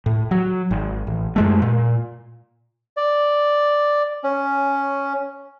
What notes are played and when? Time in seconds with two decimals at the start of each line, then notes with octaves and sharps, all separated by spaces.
0.06 A2
0.31 F#3
0.71 G#1
1.07 A1
1.36 F#2 G#3 A3
1.62 A#2
2.97 D5
4.24 C#4